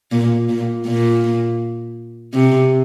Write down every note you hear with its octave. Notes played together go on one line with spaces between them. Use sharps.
A#2
A#2
A#2
C3